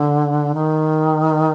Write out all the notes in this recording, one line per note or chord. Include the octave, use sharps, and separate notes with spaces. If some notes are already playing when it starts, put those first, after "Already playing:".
Already playing: D3
D#3